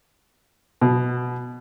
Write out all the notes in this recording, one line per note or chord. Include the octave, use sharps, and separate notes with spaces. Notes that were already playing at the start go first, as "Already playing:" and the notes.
B2